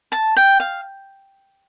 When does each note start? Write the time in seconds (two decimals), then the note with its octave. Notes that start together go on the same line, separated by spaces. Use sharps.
0.12 A5
0.36 G5
0.60 F5